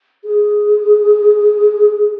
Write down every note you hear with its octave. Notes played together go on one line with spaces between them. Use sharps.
G#4